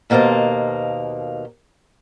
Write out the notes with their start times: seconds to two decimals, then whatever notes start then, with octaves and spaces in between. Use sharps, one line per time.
0.10 D#2 B2 A#3 C5 D#5 A5